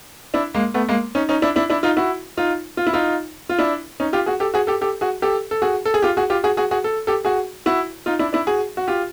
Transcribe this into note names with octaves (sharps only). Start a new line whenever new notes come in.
D4 E4
G#3 A#3
A3 B3
G#3 A#3
C#4 D#4
C#4 D#4
D4 E4
D4 E4
D4 E4
D#4 F4
E4 F#4
D#4 F4
F4
E4
D#4 F4
F4
D4 E4
C#4 D#4
F4 G4
F#4 G#4
G4 A4
F#4 G#4
G4 A4
G4 A4
F#4 G#4
G4 A4
A4
F#4 G#4
A4
G#4
F4 G4
F#4 G#4
F4 G4
F#4 G#4
F#4 G#4
F#4 G#4
A4
G4 A4
F#4 G#4
E4 F#4
D#4 F4
D4 E4
D4 E4
F#4 G#4
F#4
F4 G4